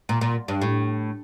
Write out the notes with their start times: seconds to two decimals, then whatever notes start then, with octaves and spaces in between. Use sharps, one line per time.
0.09 A#2
0.21 A#2
0.48 G2
0.62 A2